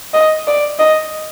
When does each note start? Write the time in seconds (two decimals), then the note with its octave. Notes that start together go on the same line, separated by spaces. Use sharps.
0.14 D#5
0.47 D5
0.79 D#5